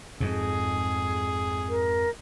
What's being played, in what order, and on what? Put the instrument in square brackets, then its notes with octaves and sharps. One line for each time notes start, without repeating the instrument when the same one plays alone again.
[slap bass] F2 G#2 [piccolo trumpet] G#4
[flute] A#4